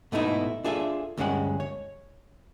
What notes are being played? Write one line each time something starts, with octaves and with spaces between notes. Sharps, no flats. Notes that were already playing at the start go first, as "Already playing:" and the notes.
G#2 B2 A3 B3 D#4 E4
D4 F4 G#4 A4 E5
D2 G2 G#3 C#4 F#5
C#5